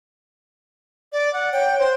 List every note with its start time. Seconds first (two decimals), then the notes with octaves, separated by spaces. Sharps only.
1.12 D5
1.33 F#5
1.53 C#5 G5
1.79 C5